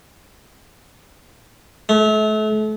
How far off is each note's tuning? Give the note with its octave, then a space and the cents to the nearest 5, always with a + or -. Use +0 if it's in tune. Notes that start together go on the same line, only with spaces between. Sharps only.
A3 -35